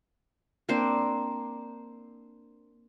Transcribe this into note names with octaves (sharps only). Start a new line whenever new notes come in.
A#3 C4 D4 C5